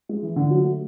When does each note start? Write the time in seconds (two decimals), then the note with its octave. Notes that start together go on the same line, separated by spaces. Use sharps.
0.09 G#3
0.23 E3
0.36 D3
0.50 F#3
0.64 A3